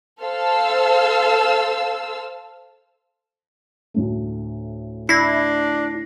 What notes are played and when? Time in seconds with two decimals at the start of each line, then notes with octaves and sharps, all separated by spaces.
0.22 A4 C5 F5 E6
3.94 D2 A2 A3
5.09 D4 E4 A#6 C7